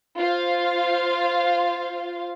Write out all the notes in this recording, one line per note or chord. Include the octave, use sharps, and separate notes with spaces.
F4 C5 F5